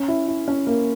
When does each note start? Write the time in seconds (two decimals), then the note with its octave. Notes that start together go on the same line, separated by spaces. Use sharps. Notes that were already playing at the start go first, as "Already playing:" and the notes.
Already playing: C#4
0.08 E4
0.28 E4
0.48 C#4
0.67 A#3